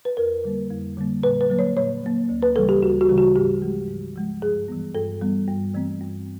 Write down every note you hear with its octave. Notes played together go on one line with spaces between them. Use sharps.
B4
F2 A#4
D3 G3 A#3
F2
D3 G3 A#3
A#2 B4
B4
F#3 A#3
C#5
A#2 C#5
F#3 A#3
D2
B4
C#3 E3 G3 A4
G4
D2 F#4
F#4
C#3 E3 G3
F#4
G#2 G4
F3 G#3
G#2
F3 G#3
G2 G#4
E3 G3 B3
G2 A4
E3 G3 B3
G2
E3 A3 C4
G2